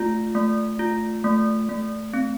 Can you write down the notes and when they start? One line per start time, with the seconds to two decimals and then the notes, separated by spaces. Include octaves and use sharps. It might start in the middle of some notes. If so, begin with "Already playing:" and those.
Already playing: A3 F4
0.35 A3
0.79 F4
1.24 A3
1.69 A3
2.14 C4